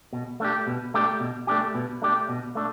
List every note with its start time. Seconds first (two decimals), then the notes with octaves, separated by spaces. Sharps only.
0.13 B2
0.40 A3 D4 G4
0.67 B2
0.94 A3 D4 G4
1.20 B2
1.47 A3 D4 G4
1.75 B2
2.02 A3 D4 G4
2.29 B2
2.55 A3 D4